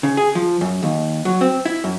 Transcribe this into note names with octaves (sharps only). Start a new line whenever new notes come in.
C#3
G#4
F3
F#2
D#2
F#3
C4
E4
F#2